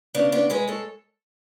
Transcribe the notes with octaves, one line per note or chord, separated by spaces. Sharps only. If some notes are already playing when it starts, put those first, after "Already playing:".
C#3 B3 D4
B3 D4
G#3 G#4 B4
A4 C#5